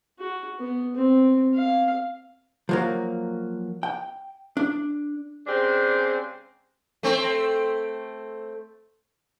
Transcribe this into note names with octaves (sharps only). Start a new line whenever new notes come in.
F#4
B3
C4
F5
F3 F#3 A#3
G5
D4
C#3 G#3 C4 D4 G4 C5
A3 C4